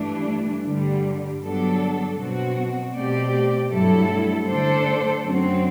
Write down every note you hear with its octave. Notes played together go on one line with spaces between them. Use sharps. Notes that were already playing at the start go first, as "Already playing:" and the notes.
Already playing: G2 E3 A3 D4
G2 D3 G3
G2 F#3 B3 D4 A4
B2 F#3 C4 F#4
B2 A3 C4 G4 D5
G2 F#3 A3 E4 A4
D3 A3 D4 A4 C5
F#2 F#3 C4